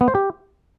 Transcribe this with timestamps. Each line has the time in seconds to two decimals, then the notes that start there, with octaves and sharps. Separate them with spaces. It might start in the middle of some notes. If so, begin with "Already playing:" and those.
0.01 B3
0.08 C5
0.15 G4